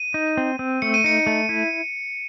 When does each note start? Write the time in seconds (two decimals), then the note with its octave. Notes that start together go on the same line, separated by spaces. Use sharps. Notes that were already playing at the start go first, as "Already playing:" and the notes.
Already playing: D#7
0.14 D#4
0.37 C4
0.59 C4
0.82 A3 C#7
0.94 D#7
1.04 D#4 C#7
1.27 A3
1.49 E4